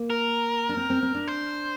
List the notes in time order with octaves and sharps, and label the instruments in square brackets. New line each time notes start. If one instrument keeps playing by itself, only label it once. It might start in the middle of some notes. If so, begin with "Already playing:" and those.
Already playing: [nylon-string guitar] A#3
[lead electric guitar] A#4
[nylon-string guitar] D4
C4
C4
C4
D4
[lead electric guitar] C5